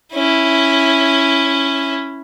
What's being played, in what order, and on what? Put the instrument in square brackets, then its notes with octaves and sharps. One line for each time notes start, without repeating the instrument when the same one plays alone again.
[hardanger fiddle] C#4 E4